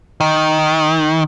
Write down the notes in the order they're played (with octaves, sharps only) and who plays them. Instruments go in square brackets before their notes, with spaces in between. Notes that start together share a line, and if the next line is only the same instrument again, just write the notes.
[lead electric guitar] D#3